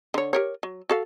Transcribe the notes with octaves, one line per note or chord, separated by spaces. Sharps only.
D3 C#5
G4 A#4 C#5
F#3
F#4 A4 F5